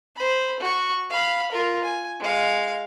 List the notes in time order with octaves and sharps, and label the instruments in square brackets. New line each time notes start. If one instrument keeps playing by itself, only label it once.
[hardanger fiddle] C5 B5
F#4 C#6
F5 B5
F4 A#4
G#5
G#3 F5